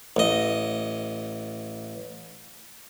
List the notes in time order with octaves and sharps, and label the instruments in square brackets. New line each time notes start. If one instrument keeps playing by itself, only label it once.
[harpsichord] A1 D#5